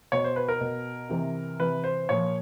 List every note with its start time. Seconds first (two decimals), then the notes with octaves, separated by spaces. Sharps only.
0.12 B2 C#5
0.24 C5
0.36 B4
0.48 A#4
0.61 B2
1.10 C3 E3
1.60 C3 E3 B4
1.84 C5
2.09 A#2 F3 C#5